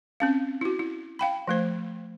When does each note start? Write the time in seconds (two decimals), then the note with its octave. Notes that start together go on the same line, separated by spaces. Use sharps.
0.20 C4 C#4 F5
0.61 E4 F#4
0.79 E4
1.19 F5 G5 B5
1.48 F3 A3 C5